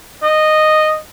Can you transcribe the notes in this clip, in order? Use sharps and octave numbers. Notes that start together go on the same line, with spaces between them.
D#5